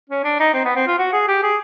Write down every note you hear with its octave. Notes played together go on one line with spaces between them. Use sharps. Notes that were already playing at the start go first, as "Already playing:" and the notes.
C#4
D4
D#4
C4
B3
C4
F4
F#4
G#4
G4
G#4